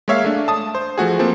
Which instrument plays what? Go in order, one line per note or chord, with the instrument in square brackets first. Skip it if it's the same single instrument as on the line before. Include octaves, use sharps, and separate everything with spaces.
[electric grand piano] G#3 A#3 C#5 E5 F5
A3 D4
A5 D#6
C5
F3 A3 F#4 G#4
F3 A#3 C4